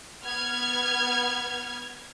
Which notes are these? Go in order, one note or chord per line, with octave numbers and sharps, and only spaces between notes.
B3 F6 G#6